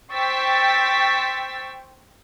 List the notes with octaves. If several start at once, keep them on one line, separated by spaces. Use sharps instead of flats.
C5 G5 C#6 E6 A6 B6